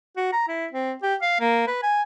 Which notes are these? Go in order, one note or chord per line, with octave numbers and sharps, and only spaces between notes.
F#4
A#5
E4
C4
G4
F5
A#3
B4
G#5